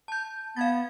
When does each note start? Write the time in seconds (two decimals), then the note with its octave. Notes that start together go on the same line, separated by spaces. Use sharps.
0.08 A5 G6
0.57 B3 F5 G#6 A6